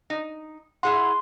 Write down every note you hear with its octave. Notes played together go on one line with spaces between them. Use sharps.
D#4
E4 G#4 F#5 C6